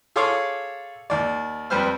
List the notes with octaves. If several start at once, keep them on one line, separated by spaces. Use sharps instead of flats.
G#4 A4 C#5 F5 C6 D6
D#2 D5
F2 G3 B4 C5 F6